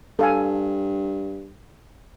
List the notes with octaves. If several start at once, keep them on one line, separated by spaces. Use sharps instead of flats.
G2 A4 F5 G#5